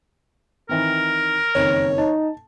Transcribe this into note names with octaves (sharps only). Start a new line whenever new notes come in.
D#3 E3 C4 A#4
F#1 F2 D#3 C#5
D#4 A5